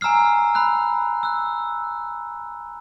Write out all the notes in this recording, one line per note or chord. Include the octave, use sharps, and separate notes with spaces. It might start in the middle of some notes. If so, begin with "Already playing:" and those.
G#5 A#5 E6 F6 C7
B5 E6 F#6
E6 F#6